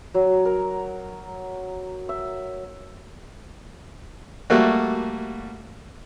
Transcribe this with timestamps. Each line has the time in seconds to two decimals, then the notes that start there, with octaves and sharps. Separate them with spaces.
0.14 F#3
0.45 A#4
2.09 E5
4.50 G3 A3 A#3 F#4